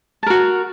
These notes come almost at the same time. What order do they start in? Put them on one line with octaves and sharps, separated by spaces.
A5 A#4 F#4